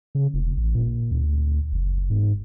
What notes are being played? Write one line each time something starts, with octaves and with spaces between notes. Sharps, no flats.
C#3
E1
A1
A#2
D2
F#1
G#2